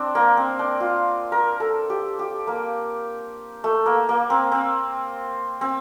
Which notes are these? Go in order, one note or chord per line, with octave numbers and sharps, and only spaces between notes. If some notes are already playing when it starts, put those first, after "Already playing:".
Already playing: C4 D4
A#3
C4
D4
F4
A#4
A4
G4
G4
A#3
A3
A#3
A#3
C4
C4
C4